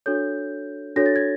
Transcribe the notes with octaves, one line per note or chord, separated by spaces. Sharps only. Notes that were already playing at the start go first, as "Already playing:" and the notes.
D4 F#4 A4 C#5 G6
D4 F#4 A4 C#5 A#6
A6
G#6